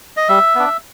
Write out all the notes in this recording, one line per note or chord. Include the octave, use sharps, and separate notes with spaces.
D#5
G3 E5
B3 D4